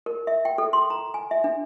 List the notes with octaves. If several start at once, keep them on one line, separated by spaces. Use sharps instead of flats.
A#4
E5
G5
A4
C6
A#5
G#5
E5
D4